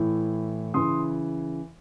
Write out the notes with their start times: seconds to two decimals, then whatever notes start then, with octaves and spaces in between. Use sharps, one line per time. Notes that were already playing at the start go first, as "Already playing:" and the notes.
Already playing: A2 E3
0.74 C#3 E3 C6 D#6